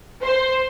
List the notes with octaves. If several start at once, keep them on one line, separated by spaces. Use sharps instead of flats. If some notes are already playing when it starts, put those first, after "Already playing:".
C5